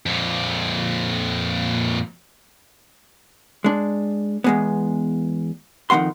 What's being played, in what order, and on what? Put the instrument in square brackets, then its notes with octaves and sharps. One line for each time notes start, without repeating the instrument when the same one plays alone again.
[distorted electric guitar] F2 A#2
[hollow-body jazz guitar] G#3 D4
E2 G#3 B3
F2 D#3 A3 F#5 C6